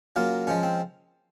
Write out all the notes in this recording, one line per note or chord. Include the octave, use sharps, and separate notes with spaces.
C#3 F#3 A#3 F4
C#3 F3 G#3 C#4
C4